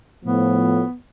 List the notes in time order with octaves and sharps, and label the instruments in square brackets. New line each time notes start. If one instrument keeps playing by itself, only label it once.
[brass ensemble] A2 F3 [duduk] B3